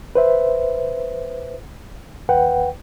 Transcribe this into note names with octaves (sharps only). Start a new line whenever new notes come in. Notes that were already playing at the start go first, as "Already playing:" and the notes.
B4 C5 E5
D#2 B4 F#5 G5